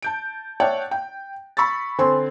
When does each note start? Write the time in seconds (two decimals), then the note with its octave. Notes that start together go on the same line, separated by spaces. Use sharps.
0.02 A5 G6 D7
0.60 C#5 D5 E5 F#5 G5 A5
0.91 G5
1.57 B5 C#6 E6 A6
1.98 D3 C4 C5 G#5 C6